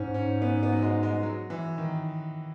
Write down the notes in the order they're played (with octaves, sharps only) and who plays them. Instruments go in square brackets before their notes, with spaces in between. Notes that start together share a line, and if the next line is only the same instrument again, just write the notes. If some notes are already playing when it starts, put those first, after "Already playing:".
Already playing: [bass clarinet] G#2 [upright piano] C#4
[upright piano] C#4
B3
B3
F#3
G#3
G#3
F#3
E3
D#3